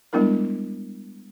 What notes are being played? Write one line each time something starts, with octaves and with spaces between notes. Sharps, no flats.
G3 G#3 B3 D4 E4 A#4